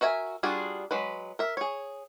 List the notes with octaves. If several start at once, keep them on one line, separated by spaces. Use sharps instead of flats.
F#4 A#4 E5 G#5
G3 D4 F4 F#4 G#4
F#3 G#3 B4
A#4 E5
G#4 C#5